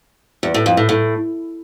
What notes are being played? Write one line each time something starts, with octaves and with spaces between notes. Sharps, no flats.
E2
A2
F2
A2
A2